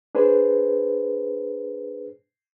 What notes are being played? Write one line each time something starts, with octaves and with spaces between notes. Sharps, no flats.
D4 G#4 B4 C5